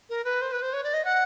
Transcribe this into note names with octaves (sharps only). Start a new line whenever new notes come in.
A#4
B4
C5
B4
C5
C#5
D5
D#5
F#5